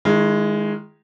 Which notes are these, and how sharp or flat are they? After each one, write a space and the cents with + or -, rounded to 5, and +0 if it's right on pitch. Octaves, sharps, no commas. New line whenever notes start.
D#3 +0 G#3 +0 E4 +35